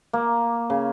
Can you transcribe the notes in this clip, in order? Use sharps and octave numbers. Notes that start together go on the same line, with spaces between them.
A#3
C#3